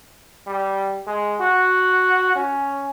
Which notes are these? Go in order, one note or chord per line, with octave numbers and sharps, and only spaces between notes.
G3
G#3
F#4
C#4